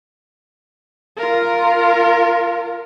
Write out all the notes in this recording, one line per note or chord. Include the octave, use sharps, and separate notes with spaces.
F4 A#4